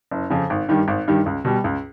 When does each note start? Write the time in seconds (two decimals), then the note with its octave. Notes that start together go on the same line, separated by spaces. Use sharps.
0.11 F#1
0.30 F2 C#3
0.50 G#1
0.69 G2 D#3 G3
0.88 G#1
1.08 G2 D#3 G3
1.26 C#2
1.45 B2 G3
1.64 C#2